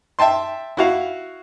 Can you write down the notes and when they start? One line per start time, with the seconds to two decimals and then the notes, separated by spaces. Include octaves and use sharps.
0.19 E5 G5 A5 C6
0.77 E4 F#4 F5